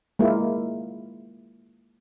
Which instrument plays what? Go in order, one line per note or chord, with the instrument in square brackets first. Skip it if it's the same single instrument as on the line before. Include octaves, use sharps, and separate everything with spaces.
[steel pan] G#3 A#3 E4 F4